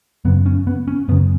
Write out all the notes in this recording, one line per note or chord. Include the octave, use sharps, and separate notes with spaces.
F#2 C#3 B3
C#4
B3
C#4
F#2 C#3 B3